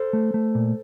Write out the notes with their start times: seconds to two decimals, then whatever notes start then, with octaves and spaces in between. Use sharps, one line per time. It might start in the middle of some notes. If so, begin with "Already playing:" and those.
Already playing: A4 C5
0.13 A3
0.34 A3
0.55 A#2